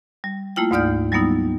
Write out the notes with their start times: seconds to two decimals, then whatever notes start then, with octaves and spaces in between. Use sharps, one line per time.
0.24 G3
0.56 A3 A#3 E4 F4 G5
0.71 D2 G#2 D#4 D5 F6 G6
1.12 F#3 G3 A#3 B3 D#4 E4